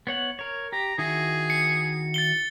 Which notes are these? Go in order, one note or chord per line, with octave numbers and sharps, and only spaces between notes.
B3 C#5 F#5
A#4 C#5
G4 A#5
D#3 E4 F#4 G#4
C#7
A6 C#7 G7